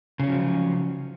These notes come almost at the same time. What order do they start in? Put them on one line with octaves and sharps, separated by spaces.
C#3 C#4 F#3 F3